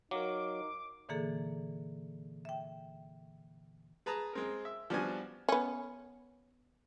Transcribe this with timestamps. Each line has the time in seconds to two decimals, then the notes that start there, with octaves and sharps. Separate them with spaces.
0.11 F#3 D#4 A#4 F5 D6
1.09 A#2 D3 E3 A#3 G#4 A4
2.45 E5 G5
4.06 G#4 B4 A5 A#5
4.33 G#3 C4 A#4
4.65 E5
4.90 F3 G3 B3 D4 F#4 G#5
5.49 B3 C#4